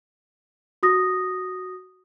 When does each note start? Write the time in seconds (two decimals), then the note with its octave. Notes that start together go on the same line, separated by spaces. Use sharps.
0.83 F#4 D#6 A#6